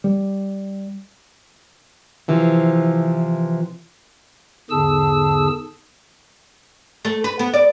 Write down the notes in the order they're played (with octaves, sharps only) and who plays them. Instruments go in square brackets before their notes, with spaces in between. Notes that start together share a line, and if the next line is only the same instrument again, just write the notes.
[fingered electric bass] G3
[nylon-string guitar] C3 E3 F3
[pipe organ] E2 G#2 D3 G#4 A5 E6
[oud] A3
B4
B3
D5